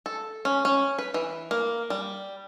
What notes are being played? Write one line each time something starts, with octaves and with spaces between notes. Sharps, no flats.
A4
C#4
C#4
B4
E3
A#3
G3